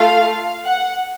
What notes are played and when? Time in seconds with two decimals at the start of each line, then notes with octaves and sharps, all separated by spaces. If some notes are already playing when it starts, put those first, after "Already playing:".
Already playing: A3 F4 A4 F5
0.65 F#5